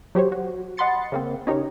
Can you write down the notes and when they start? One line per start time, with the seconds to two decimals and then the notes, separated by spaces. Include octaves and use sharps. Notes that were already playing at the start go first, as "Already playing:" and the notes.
0.15 F#3 G4 C5 C#5
0.32 F#4
0.77 D#5 F#5 B5 C6 A6 C#7
1.12 C#3 A#3 C4
1.47 C#4 D#4 G4 A#4 C#5